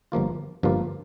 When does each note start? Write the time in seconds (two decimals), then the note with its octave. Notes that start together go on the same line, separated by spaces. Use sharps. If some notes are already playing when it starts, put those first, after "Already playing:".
0.12 G1 G2 F3 A#3 F4
0.63 G1 G2 F3 A#3 F4